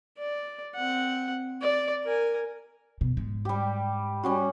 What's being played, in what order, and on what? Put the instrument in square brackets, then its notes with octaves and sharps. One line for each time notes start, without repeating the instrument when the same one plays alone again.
[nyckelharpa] D5
C4 F#5
D5
A#4 G#5
[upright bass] B2
G#2
[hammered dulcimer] G3 G4
G3 C#4 F#4